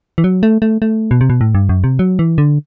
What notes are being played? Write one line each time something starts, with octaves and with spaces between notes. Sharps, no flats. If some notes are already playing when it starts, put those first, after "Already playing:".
E3
F#3
A3
A3
A3
B2
C3
B2
A2
G2
F#2
C3
F#3
E3
D3